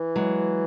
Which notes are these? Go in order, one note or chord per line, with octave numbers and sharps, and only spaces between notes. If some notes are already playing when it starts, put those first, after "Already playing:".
Already playing: E3
F#3 G#3